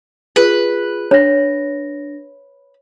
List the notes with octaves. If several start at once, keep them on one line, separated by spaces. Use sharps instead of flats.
F4 G#4 B4
D4 C#5 A#6